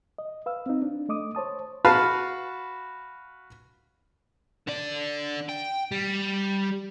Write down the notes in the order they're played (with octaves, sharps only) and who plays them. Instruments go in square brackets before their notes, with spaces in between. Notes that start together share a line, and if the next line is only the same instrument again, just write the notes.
[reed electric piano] D#5
B4 F5 E6
C4 D#4
D4
A3 D#5 D6 D#6
C5 C#5 A5 D#6
[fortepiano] F#4 B4 F5 A5 B5 F6
[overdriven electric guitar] D3 D5
G5
G3